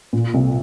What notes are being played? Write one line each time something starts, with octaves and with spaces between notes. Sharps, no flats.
A#2
C2